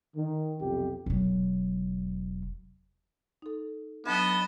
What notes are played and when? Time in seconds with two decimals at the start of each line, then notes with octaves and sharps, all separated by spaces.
0.16 D#3
0.60 B1 F2 C3 G4
1.06 E1 F#3
3.42 D#4 A4
4.06 F#3 B3 D4 D#5 G5 A5 B5